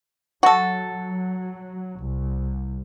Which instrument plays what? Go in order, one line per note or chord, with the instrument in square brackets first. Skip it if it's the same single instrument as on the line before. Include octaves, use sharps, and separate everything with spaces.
[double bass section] F#3 [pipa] F#4 A4
[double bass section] C2